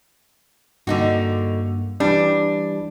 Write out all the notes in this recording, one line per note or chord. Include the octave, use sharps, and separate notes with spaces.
G2 D3 A#3 D#4 F#4
E3 G3 D4